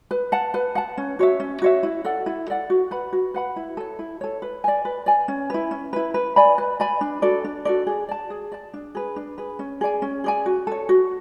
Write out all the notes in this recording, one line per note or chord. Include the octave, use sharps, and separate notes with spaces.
B4
F#5 A5
B4
F#5 A5
C#4
F#4 C#5 E5
C#4
F#4 C#5 E5
E4
A4 D5 F#5
E4
A4 D5 F#5
F#4
B4 F#5 B5
F#4
B4 F#5 B5
E4
A4 C#5
E4
A4 C#5
B4
D5 G#5
B4
D5 G#5
C#4
E4 B4
C#4
E4 B4
B4
D5 G#5 B5
B4
D5 G#5 B5
D4
F#4 A4 D5
D4
F#4 A4 D5
G#4
D5 A5
G#4
D5 A5
D4
G#4 B4
D4
G#4 B4
C#4
G#4 D5 G#5
C#4
G#4 D5 G#5
F#4
A4 C#5
F#4